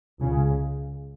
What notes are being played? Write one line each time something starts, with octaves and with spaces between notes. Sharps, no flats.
C#2 C#3